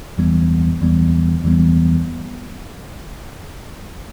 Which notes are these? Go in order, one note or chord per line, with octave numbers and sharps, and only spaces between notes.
E2 E3 G3 B3
E2 E3 G3 B3
E2 E3 G3 B3